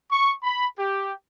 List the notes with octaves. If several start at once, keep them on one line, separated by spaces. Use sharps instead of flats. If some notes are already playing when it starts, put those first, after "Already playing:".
C#6
B5
G4